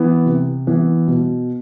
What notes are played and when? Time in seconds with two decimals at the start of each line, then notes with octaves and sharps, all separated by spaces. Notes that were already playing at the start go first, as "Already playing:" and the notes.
Already playing: E3 B3
0.26 C3
0.67 E3 B3
1.08 B2